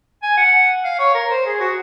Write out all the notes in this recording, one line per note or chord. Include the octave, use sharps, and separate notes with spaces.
G#5
F#5
F5
C#5
A#4
C5
G#4
F#4